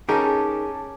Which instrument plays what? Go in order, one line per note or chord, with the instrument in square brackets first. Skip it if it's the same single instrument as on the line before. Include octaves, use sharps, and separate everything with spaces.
[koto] C#4 G4 [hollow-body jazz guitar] D#4 A#4 [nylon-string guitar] G#4 E5 [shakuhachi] A5